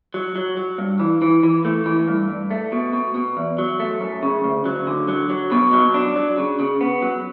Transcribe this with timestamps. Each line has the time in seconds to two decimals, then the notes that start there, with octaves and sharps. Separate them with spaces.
0.14 F#3
0.36 F#3
0.57 F#3
0.78 G2
1.00 E3
1.22 E3
1.43 E3
1.65 A3
1.86 E3
2.08 G2
2.29 G2
2.51 A3
2.72 B2
2.93 B2
3.15 B2
3.37 E2
3.58 F#3
3.80 A3
4.01 F#2
4.23 C#3
4.44 D2
4.66 F#3
4.87 D3
5.08 F#3
5.30 F#3
5.52 B2
5.73 F#3
5.94 D4
6.16 F#3
6.38 C#3
6.60 C#3
6.81 B3
7.02 F#3